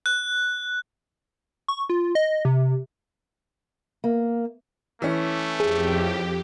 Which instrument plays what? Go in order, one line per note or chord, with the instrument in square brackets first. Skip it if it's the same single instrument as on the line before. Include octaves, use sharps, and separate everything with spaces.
[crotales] F#6
[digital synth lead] C#6
F4
D#5
C3
[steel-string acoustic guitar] A#3
[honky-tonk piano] E3 C#4 [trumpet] A3
[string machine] F2 G4 [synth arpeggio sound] G#4